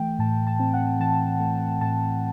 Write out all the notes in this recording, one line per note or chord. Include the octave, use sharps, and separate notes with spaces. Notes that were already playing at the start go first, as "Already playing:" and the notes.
Already playing: E3 A3 G5
A2 A5
A5
C4
F#5
E3 A5
A3
A2 A5